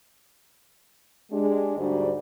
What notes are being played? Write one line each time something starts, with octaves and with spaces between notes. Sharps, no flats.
G#3 D4 G4
D2 G#2 G3 F#4 C5 D5